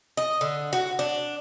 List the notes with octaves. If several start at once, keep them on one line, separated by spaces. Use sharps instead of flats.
D#5
D3
F#4
D4